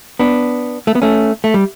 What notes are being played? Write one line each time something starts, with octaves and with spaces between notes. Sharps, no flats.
B3 D4
A3
B3
A3 C#4
A3
G3